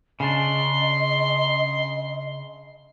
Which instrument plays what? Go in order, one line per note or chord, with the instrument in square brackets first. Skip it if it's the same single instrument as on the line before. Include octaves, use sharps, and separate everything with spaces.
[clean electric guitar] C#3 D4 [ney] D#5 [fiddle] C6